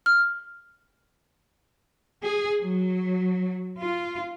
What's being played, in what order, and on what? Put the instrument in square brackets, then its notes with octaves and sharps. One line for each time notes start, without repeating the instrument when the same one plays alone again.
[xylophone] F6
[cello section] G#4
F#3
F4